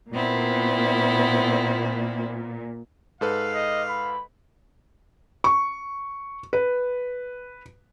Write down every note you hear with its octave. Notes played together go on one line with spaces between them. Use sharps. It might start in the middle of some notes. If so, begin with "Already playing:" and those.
A#2 B3 C4 E4
G#2 A4 B4 F5
D#5
B5
C#6
B4